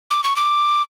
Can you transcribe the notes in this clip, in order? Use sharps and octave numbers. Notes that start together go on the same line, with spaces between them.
D6
C#6
D6